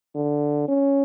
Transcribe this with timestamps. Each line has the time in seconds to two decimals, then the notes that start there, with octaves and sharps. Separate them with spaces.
0.15 D3
0.68 C#4